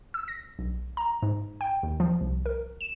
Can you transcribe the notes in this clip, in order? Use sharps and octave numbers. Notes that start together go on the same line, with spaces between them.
E6
A#6
B1
A#5
G#2
G5
D#2
F3
C2
A#4
E7